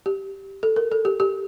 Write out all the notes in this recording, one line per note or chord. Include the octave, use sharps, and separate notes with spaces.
G4
A4
A#4
A4
G4
G4